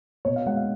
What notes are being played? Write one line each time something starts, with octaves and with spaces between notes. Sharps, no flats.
B2 C#5
F5
G#3 F#5
F5